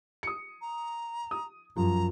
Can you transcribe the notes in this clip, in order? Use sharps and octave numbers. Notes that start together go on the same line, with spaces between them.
D#6 C#7
A#5
D#6
F#2 F3 A#5